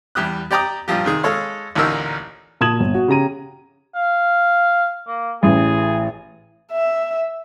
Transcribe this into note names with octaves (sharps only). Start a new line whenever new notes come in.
E2 G3 G4 D#6 F#6
G4 D5 G5 A#5 D6 D#6
G2 A#2 F3 G4
C3 D#3 G#4
G#3 A4 C#5 F5
A1 D2 A#2 D#4 A#4 E6
A#2 A5 D#6 G#6 E7 F#7
G1
F#4
C#3 G4 A#5 D#7
F5
A#3
A1 G#4
E5